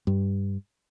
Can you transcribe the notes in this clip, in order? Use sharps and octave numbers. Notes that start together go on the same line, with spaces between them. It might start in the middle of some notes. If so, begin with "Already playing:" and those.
G2